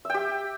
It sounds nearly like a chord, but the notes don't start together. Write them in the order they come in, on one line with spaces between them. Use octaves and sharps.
E5 G5 G4